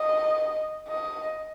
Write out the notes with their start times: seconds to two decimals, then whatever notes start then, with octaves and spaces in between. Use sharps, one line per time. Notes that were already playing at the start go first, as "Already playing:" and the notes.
Already playing: D#5
0.88 D#5